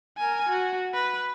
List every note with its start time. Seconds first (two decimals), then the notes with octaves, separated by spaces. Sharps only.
0.18 A#4 G#5
0.50 F#4
0.94 B4